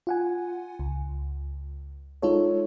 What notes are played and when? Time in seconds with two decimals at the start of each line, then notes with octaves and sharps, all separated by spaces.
0.07 F4 F#5 G#5
0.79 C#2
2.22 G#3 D#4 F4 A4 C#5